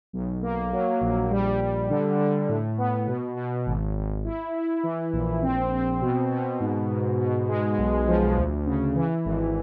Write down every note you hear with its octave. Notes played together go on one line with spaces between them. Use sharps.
B1
A#3
F#3
A#1
G3
G3
D3
D3
A2
B3
B2
B2
G#1
G#1
E4
E4
E3
A#1
C4
C4
B2
B2
G#2
G#2
B2
G#3
B1
F3
D2
C#3
E3
G#1